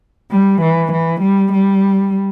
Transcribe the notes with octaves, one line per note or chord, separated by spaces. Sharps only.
G3
E3
E3
G3
G3